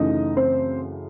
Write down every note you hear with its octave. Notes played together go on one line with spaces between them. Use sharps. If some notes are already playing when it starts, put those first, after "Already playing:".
Already playing: F#2 C#3 E3 A3 D#4 D#5
C4 C5